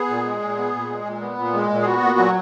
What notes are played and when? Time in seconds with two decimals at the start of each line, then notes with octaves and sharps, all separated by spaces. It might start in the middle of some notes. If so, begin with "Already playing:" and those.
Already playing: B3 G#4
0.09 A#2
0.25 G#3
0.42 A#2
0.57 B3
0.74 A#2
0.90 G#3
1.05 A#2
1.21 B3
1.38 A#2
1.54 G#3
1.70 A#2
1.81 G#4
1.85 B3 F#4
2.02 A#2
2.18 F#3